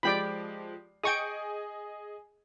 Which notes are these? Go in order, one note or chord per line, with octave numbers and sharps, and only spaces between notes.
F3 G#3 G4 D5 G5 B5
G#4 D#5 G5 G#5 C#6 D#6